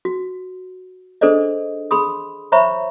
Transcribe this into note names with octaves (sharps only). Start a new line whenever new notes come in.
F#4
D4 G#4 A4 C5 D5 D#5
G#4 B5 C6 D#6
C5 C#5 E5 A#5 B5 C#6